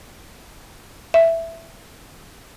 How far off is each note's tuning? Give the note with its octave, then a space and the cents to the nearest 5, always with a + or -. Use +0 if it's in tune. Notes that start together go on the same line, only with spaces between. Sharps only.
E5 +5